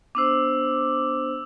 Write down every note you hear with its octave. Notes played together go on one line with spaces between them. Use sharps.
B3 D4 C5 D6 E6